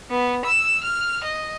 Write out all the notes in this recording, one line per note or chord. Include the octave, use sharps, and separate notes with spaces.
B3
E6
F6
D#5